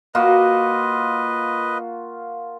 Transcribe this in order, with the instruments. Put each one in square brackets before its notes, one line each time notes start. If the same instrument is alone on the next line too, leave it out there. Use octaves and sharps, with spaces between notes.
[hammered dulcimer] A#3 F4 F#4 [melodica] B4 D#5